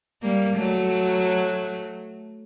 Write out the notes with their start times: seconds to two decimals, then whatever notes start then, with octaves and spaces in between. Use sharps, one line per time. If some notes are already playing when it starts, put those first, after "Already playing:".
0.23 G3 A#3
0.57 F#3 A3